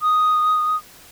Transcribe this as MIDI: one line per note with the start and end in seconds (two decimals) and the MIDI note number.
0.02 0.77 87